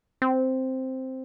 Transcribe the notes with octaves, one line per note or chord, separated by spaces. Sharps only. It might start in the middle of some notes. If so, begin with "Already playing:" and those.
C4